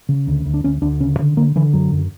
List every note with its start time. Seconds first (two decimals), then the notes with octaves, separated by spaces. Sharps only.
0.09 C#3
0.27 D2
0.46 D2
0.54 D4
0.64 D2 C#4
0.82 D2 D4
1.01 C#3 C#4
1.19 D3
1.37 D3 A#3
1.56 D3 E3
1.73 F#2 F#3
1.92 F#2